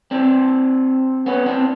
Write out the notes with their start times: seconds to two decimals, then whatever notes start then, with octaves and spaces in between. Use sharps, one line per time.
0.11 C4 D4
1.26 B3 C#4
1.46 C4 D4